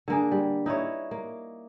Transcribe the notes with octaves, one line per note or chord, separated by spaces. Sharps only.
D3 A#3 G#4
G3
D#4 E4 B4 C#5
A#3